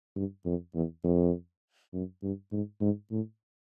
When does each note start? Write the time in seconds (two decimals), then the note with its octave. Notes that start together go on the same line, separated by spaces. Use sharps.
0.16 G2
0.46 F2
0.75 E2
1.04 F2
1.93 F#2
2.22 G2
2.52 G#2
2.81 G#2
3.11 A2